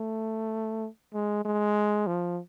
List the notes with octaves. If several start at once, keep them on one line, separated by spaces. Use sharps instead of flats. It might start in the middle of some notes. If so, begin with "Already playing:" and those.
Already playing: A3
G#3
G#3
F3